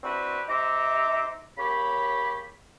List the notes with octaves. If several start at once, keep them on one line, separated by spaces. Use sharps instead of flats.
C4 D4 E4 F#4 G4 B4
C3 D#4 C5 E5 A#5 D6
C#3 A#3 G4 C#5 B5